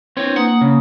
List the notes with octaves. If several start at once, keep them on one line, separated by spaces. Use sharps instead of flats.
C4 D4 E4 B4 C#5
A#3 F#5 A#5 D#6
C#3